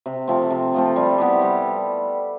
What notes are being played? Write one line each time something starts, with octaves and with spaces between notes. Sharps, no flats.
C3
F3 A3 C4
C3
F3 A3 C4
G3
B3 E4 G4
G3